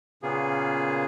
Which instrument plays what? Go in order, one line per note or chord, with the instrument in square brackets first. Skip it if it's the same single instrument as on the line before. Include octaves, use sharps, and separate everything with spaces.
[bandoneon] A#2 C#3 A#3 B3 G#4